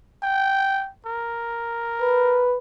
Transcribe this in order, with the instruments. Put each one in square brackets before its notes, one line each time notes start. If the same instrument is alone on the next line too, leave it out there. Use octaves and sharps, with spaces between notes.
[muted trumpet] G5
A#4
[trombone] B4